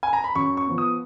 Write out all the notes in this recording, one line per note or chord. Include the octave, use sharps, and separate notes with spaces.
G#5
A#5
B5
F#2 C#6
C#6
F3 B3
D#6